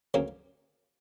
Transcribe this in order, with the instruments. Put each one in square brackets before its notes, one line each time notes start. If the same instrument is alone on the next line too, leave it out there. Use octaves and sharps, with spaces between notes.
[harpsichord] D2 C#3 F#3 A#3